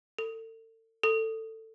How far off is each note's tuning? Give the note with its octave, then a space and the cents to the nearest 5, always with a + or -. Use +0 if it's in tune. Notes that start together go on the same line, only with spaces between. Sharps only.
A4 +35
A4 +15